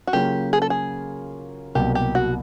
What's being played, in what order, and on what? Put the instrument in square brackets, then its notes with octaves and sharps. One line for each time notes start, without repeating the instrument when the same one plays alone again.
[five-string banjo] F#4
[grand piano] C#3 F#3 A#3 C#4 F4 [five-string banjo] G4
[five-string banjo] G#4
A4
G#4
[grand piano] C2 B2 F#3 A#3 [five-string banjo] G4
[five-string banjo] G4
F#4